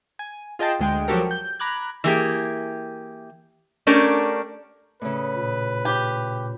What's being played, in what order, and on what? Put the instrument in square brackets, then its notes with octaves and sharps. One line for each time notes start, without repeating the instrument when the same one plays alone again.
[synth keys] G#5
F4 G#4 D#5 G5 A5
D2 G#3 G5
F3 F#3 F#4 G4 A4 A#4
G6
A#5 B5 D6 F#6 G#6
[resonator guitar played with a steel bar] E3 A#3 G4 G#4
A3 C#4 D4 G4 A#4
[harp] A2 C#3 [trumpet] B4
[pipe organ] A#2
[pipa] G4